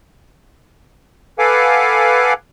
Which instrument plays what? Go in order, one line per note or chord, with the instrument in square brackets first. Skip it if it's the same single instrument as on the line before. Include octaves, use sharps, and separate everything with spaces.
[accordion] A4 B4 F5 F#5 G#5 D6